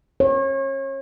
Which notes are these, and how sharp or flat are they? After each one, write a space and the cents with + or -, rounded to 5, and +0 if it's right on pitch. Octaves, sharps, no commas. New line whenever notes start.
C#5 -35